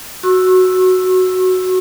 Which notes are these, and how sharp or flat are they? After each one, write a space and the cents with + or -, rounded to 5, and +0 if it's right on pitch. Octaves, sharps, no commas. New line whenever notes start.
F#4 +0 C#6 -40 E6 +5